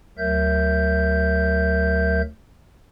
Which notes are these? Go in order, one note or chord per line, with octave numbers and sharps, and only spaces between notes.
D2 F#3 A#4 E5 G6